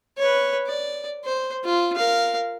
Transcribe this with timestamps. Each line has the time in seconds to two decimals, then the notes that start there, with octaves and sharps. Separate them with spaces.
0.18 B4 C#5
0.67 D5
1.25 C5
1.65 F4
1.95 A#4 F5